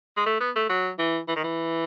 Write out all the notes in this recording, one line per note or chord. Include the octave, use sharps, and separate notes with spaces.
G#3
A3
B3
A3
F#3
E3
E3
D#3
E3